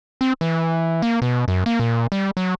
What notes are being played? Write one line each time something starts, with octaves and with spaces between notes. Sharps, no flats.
C4
E3
A#3
B2
F#2
A#3
A#2
G3
F#3